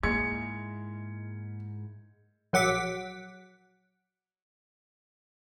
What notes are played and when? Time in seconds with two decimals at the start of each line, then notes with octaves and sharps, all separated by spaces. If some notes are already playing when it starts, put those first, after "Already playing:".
0.03 G#2 G#3 A#3 E4 A#4 G#6 C#7
2.53 A#1 F#3 F#5 D6 B6